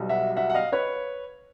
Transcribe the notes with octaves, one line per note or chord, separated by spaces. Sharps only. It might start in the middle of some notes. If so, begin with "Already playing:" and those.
Already playing: B1 B2 G3
E5 F#5
E5 F#5
F#5
D#5 F5
B4 C#5